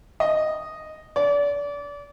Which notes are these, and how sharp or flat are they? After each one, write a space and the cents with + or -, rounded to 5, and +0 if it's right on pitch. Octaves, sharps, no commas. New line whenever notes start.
D#5 -5
D5 -30